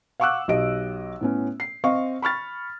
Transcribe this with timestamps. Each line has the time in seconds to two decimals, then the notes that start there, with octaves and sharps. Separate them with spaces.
0.20 F5 F#5 C#6 D6 E6 F#6
0.48 B1 G4 D#5 D7
1.21 A2 B3 C#4
1.60 C7
1.84 C4 D#5 F5 C#6
2.22 B5 C#6 F6 A6